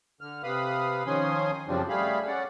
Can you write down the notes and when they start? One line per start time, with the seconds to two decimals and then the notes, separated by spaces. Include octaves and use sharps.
0.21 D3 F6
0.44 C3 B4 F5 B5 D#6
1.07 D#3 F3 C#4 G#5 C6 D#6
1.68 F#2 C#3 F3 G3 C4 D4
1.89 G3 A3 G#4 F5 B5
2.27 C#4 D5 F#5